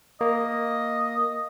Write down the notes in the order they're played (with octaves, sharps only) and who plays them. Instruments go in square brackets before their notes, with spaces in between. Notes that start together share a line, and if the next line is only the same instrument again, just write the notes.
[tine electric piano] A#3 [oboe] D#5